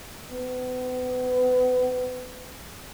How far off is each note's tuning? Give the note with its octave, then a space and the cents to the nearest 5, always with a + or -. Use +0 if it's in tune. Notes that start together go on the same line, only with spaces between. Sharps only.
B3 +35